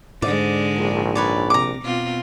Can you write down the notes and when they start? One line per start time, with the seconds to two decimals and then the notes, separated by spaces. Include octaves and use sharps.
0.22 G#2 D3 G#3 D5
0.77 A#1
1.15 B4 C#5 D5
1.50 C3 A#5 D6
1.83 B2 C4 F4